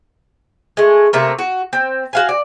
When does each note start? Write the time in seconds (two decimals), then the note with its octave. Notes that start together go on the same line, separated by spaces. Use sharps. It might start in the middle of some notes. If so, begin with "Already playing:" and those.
0.77 G#3 A3
1.13 C3 A3 A#3
1.39 F#4
1.73 C4
2.13 F#4 F5 G#5
2.29 D5